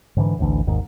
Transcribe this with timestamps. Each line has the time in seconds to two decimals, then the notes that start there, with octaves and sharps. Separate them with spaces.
0.17 G#2 D3 E3
0.39 A1 D2 D3 E3
0.67 G#1 D#2 G#2 D#3